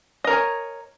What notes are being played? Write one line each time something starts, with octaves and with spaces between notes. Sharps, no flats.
A#4 C#5 D#5 G#5